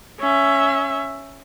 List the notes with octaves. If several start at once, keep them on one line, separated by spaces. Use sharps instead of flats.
C#4 E5